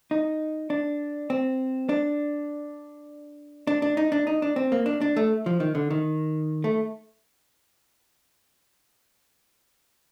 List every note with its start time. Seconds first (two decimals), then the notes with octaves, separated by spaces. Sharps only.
0.11 D#4
0.70 D4
1.30 C4
1.89 D4
3.67 D4
3.82 D4
3.97 D#4
4.12 D4
4.27 D#4
4.42 D4
4.56 C4
4.72 A#3
4.86 D4
5.01 D4
5.16 A3
5.46 F3
5.60 D#3
5.75 D3
5.90 D#3
6.64 A3